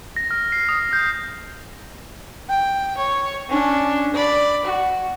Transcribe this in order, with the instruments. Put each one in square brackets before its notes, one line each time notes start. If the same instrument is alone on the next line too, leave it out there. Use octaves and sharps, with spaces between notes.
[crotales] A#6
F6
C7
D#6
G6
[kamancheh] G5
C#5
C#4 D4
D5 B5
F#4